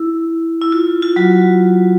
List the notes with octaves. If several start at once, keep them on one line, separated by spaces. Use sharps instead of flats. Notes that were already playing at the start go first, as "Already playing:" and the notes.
Already playing: E4
E4
F4
F4
F#3 F#4